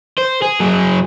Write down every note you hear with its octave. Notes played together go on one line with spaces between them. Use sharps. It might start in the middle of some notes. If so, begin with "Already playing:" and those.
C5
G#4
F#3 G#4